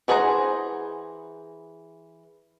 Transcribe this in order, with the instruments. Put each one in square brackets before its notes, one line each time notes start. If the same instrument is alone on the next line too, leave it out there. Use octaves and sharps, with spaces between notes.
[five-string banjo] E3 G#4 C5 F#5 A#5